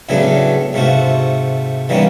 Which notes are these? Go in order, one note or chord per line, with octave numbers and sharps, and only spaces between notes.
A2 C#3 F#3 A3 B3 D4
G#2 C3 A3 F4 F#4
D#3 E3 G3 A#3 B3 C#4